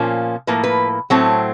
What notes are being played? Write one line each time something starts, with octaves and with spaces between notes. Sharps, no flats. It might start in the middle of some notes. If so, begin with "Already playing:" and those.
Already playing: A#2 F3 A#3 C#4
A2 F3 A#3 B4
B4
A2 F#3 A3 C4